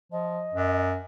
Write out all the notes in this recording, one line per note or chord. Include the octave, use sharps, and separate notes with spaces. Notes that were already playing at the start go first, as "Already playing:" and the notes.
F3 D#5
F#2